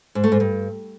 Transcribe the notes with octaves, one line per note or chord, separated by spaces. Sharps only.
G#2
A3
G#2
G2